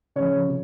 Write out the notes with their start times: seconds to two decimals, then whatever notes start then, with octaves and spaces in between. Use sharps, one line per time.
0.16 C#3 F3 C#5
0.48 C3